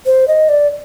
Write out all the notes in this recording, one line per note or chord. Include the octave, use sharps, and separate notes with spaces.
C5
D#5
D5